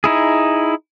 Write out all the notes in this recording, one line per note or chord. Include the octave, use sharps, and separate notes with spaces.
D#4 E4 G#4